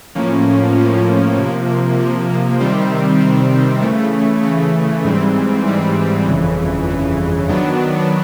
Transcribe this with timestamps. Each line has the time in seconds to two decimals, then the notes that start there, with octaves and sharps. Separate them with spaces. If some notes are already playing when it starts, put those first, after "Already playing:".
0.15 A2 F3 A#3 C#4
0.76 A2 F3 A#3 C#4
1.38 C3 F3 A#3
1.99 C3 F3 A#3
2.60 C3 D#3 G3 C4
3.21 C3 D#3 G3 C4
3.82 C#3 E3 A3
4.43 C#3 E3 A3
5.04 G#2 E3 G3 C4
5.66 G#2 E3 G3 C4
6.27 G1 F2 C#3 E3
6.87 G1 F2 C#3 E3
7.49 D#3 F#3 B3 D4